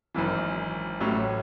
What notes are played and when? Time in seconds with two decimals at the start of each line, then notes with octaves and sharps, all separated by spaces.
0.14 G#1 F#2 E3
1.01 A1 A2 F#3 C#4